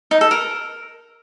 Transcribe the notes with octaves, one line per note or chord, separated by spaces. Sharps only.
D#4
A4
A#4